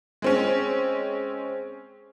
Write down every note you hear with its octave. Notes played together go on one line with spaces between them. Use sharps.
G#3 C4 C#4